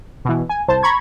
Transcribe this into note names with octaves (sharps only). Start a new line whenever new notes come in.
B2 E3
G#5
C2 C5 A5
A#5 B5 C#6 G#6